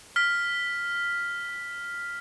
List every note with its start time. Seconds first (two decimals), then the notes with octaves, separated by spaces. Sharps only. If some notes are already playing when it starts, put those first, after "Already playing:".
0.16 F6 B6